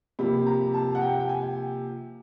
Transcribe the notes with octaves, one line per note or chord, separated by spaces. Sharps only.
C3 F3 A#3 B5
A#5
A5
F#5
G5
G5
G#5